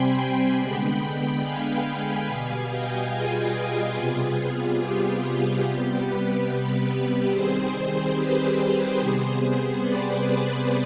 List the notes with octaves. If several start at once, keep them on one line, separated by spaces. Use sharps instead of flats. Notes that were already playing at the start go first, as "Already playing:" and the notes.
Already playing: C3 G3 C4 G5 G#5 B5 C6
G5 B5
D3 G#3 B3 G5 B5
F5 G#5
B2 G3 B3
D#5 G5
F4 G#4
C3 G3 B3 F4 G#4
G4
C3 G3 B3
G4 B4
G4 B4
D#3 G3 C4 G#4 C5
G4 B4
C3 G3 B3 G#4 C5
B4 D5